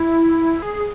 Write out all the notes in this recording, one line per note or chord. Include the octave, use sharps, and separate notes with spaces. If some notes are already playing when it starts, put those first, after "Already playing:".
Already playing: E4
G#4